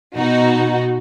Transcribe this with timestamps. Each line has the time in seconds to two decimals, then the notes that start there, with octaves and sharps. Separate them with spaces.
0.16 B2 D#4 F#4